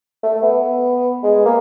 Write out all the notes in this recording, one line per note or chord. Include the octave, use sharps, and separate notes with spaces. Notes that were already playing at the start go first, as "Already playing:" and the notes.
A3
B3
G#3
A#3